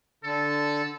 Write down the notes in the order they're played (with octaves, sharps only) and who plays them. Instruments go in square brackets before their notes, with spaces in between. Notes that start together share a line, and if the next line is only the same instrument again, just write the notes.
[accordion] D3 [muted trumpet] A4